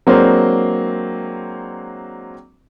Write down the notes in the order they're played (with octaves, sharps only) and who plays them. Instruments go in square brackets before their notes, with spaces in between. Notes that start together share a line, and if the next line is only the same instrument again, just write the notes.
[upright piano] F#3 G#3 A#3 C4 D4 C5